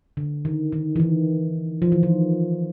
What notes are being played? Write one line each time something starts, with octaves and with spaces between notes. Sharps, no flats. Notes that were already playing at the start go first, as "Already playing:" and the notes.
D3
D#3
D#3
E3
D#3
F3
E3
D#3